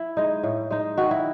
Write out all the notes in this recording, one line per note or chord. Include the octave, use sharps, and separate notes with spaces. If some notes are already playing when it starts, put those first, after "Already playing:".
Already playing: E4
G#3 D#4
A2
G#3 D#4
D#3 F#4
E4